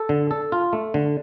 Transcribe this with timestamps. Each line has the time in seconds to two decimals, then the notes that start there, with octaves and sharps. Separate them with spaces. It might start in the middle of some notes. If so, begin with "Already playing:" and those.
Already playing: A4
0.09 D3
0.31 A4
0.52 F4
0.73 A3
0.94 D3